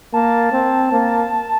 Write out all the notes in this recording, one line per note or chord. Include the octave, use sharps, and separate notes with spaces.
A#3 A5
C4
A#3